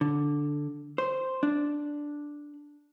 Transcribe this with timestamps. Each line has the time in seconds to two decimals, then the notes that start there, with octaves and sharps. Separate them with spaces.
0.01 D3
0.98 C5
1.43 D4